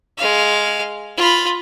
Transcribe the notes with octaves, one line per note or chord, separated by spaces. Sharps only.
G#3 F5
F4 B5